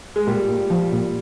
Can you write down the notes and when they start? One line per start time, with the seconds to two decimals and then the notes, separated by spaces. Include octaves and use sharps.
0.16 G#3
0.27 A#2 G3
0.48 A#2
0.70 F3
0.92 A#2